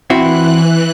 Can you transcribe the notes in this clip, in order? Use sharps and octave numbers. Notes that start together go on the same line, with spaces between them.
E3 C4 E4 F#4 F#6